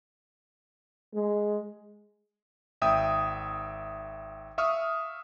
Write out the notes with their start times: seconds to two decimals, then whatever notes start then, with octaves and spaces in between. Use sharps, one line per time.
1.14 G#3
2.82 G#1 E5 G5 D#6
4.58 E5 F5 C#6 D#6 F6